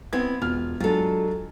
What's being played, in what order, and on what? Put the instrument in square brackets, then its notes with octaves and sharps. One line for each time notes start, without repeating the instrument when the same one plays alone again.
[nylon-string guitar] B3 C4 E4 [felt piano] G#6
[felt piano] E1 F6 [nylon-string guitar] F4
[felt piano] F#3 G#3 D4 [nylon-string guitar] F4 A4